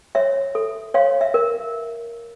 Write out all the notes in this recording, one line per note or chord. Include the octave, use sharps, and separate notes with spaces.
C#5 E5
A4
C#5 F5
E5
A#4